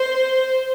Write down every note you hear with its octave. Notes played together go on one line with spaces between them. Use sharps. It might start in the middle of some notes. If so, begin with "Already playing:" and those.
Already playing: C5